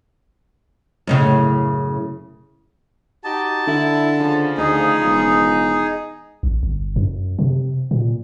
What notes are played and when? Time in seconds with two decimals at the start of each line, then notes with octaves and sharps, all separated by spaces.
1.07 F#2 A2 C#3
3.24 D#4 F#4 G4 A5
3.67 D3 E4
4.18 C#3 F3
4.58 D2 D#4 G#4
5.03 E1
6.43 A1
6.63 G1
6.96 F#2
7.39 C3
7.91 A#2